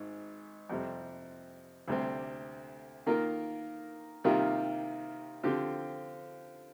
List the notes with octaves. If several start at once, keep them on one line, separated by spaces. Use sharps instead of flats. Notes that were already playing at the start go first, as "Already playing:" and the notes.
Already playing: G#1 G#2
F2 C3 G3 C4
D2 C3 G3 C4
D#3 A#3 F4 A#4
C3 D#3 G3 A#3 F4
D3 F3 C4 G4